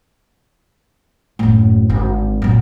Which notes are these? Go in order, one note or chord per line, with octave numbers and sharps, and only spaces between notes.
F#1 A2
G#1 D3
F#2 A#2